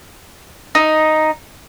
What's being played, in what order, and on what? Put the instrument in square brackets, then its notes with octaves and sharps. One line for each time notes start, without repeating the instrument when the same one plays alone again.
[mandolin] D#4